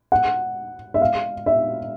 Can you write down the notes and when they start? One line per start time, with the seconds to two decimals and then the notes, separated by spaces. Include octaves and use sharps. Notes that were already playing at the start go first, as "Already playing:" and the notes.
0.12 F#5
0.94 E5
1.02 F5
1.46 E5